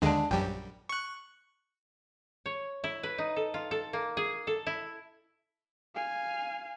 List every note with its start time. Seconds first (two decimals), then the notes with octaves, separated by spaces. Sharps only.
0.02 D#2 D3 G#3 D4 G#4
0.31 A#1 F#2 G3 G5
0.89 C#6 F#6
2.46 C#5
2.84 E4
3.03 B4
3.18 D#4
3.36 A4
3.54 F4
3.71 A4
3.93 A#3
4.17 G#4
4.47 A4
4.67 E4
5.95 F5 G#5